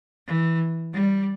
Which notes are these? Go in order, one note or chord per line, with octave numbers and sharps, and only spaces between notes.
E3
G3